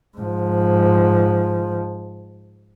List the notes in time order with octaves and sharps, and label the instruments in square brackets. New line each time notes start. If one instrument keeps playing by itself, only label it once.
[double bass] G#2 F3